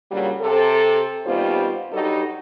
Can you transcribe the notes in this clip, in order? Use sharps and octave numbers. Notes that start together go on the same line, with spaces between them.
G2 A#2 C#3 F#3 G3
C3 A4
D#2 B2 G3 C4 F4 C5
G2 F#3 G3 D#4 A4